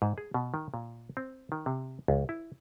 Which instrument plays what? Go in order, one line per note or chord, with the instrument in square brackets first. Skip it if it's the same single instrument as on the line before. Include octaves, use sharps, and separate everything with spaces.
[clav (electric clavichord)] G#2
G#4
B2
D#3
A#2
C4
D#3
C3
C#2
E4